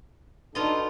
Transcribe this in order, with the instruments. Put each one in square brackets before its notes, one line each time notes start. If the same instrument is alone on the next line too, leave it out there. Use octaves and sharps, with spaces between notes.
[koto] B2 F4 D#5 [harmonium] D4 D#4 A4